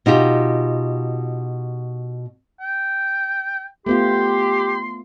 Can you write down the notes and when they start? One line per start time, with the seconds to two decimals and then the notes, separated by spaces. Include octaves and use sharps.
0.06 B2 D#4 F4 G4
2.60 G5
3.86 A3 B3 F4 G4 C6